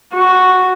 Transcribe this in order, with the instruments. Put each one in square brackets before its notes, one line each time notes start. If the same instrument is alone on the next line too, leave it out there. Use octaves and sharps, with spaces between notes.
[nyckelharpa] F#4